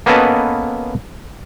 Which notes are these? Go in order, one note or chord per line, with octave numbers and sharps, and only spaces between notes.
A#3 B3 C#4 A4 B4 D#5